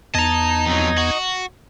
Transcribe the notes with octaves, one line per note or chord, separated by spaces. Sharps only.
E2 B3 D#5 A5 A#5 G#6
F2 F#3
F#4